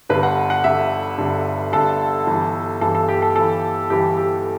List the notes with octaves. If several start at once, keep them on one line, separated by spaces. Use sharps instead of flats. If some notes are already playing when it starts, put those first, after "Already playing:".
G1 G2 D3 B4
F#5
F#5
G1 G2 D3 E5
G1 G2 D3
G1 G2 D3 A4
G1 G2 E3
G1 G2 E3 A4
A4
G4
A4
G1 G2 E3 A4
G1 G2 E3 G4
G4